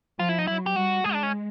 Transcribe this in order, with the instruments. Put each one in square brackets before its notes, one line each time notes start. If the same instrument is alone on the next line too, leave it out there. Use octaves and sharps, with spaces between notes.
[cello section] F3 [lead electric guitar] F4
[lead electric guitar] E4
D#4
[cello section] F#3 [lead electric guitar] E4
[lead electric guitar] G4
[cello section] G3 [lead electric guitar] F#4
[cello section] G#3 [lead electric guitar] G#4
[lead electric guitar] D4
C#4